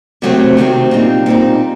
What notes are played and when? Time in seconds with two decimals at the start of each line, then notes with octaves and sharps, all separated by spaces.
0.22 C3 D#3 F#3 A3 C4
0.57 C3 D#3 F#3 A3 C4
0.91 A#2 G3 C4 D#4
1.26 A#2 G3 C4 D#4